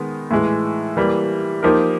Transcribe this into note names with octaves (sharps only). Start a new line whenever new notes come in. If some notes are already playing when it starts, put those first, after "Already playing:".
Already playing: D#3 G#3 B3 D#4
A2 E3 G#3
E3 G3 A#3
F3 A#3 D#4 G4 A#4